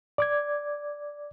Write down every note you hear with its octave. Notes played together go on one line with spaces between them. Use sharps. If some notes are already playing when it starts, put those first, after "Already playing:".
D5 D6 G#6